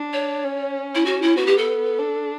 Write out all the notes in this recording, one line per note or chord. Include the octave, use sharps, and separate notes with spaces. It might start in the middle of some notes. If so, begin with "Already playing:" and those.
Already playing: D4
C#5
C#4
E4
F#4
E4
B3 F#4
G4
A4
D4